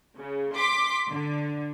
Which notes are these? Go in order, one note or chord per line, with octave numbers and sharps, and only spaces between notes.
C#3
C6 D6 B6
D3